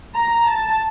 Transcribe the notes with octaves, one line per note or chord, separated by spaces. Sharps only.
A#5
A5